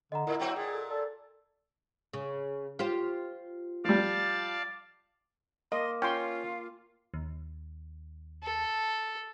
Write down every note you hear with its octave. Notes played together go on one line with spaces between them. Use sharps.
D3 D#5 F#5 A#5
A2 E4 A#4
F#3 C4 F#4 G5
A#2 G#4
A4
A4 D5
C#3
F4 G4 C5
F3 G3 D5 F5 A5
A#3 D#5 C6
C#4 F4 G5 C6
D#2
A4